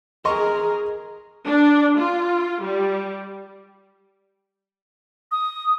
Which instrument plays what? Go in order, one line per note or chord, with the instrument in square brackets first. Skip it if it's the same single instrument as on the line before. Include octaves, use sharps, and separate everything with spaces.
[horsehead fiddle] G#4 A#4 [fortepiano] D#5 C6 C#6
[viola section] D4
F4
G3
[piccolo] D#6